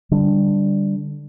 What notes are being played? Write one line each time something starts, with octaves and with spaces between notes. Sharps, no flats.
D3 G3 D4